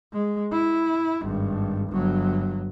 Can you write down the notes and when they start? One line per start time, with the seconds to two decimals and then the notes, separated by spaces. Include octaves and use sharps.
0.13 G#3
0.52 E4
1.22 G#1 G2
1.90 G1 F#3